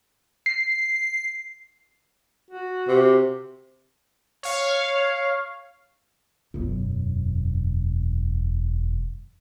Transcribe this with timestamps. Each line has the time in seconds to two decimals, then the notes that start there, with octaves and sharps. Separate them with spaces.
0.46 C7
2.50 F#4
2.88 C3
4.43 C#5 F5
6.54 E1 F#2